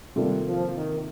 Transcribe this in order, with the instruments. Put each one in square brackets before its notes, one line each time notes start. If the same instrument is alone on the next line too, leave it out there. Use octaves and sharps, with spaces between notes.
[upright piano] C3 D#3 A#3 F4 A4 [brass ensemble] G3
[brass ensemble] F3
D#3